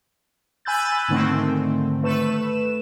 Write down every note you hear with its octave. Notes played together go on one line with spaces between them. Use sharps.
G#5 B5 E6 F#6 G6 A6
G#2 D3 D#3 A3 C4
A3 B4 E7